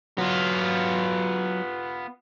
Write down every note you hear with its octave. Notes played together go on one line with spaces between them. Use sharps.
F#3 B3 F4